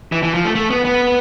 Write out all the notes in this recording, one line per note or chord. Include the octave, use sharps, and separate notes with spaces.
E3
E3
F3
A3
A3
B3
B3